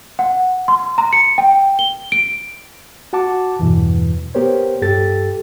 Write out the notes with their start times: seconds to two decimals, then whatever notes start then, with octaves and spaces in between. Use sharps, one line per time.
0.19 F#5
0.68 C6
0.98 A#5
1.13 C#7
1.38 G5
1.79 G7
2.12 D7
3.13 F#4 F#5 A5 D6
3.59 E2 G2 B2 E3
4.35 B3 G4 A#4 C5 C#5
4.82 G2 G4 A4 A6